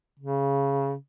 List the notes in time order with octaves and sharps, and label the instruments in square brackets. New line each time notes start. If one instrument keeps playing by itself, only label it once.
[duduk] C#3